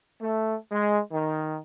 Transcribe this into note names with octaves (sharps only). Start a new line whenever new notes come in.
A3
G#3
D#3